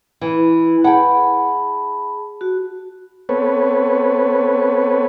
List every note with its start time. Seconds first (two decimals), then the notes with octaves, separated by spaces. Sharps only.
0.21 E3
0.84 G#4 F#5 G5 A5 B5
2.41 F#4
3.29 B3 C4 A4 B4 C#5